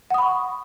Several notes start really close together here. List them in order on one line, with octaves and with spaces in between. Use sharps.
F#5 D#6 B5 C#6